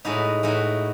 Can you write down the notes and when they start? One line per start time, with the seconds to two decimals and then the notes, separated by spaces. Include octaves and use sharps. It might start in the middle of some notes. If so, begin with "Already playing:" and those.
0.05 A2 G#3 D#4 F#4 B4
0.43 A2 G#3 D#4 F#4 B4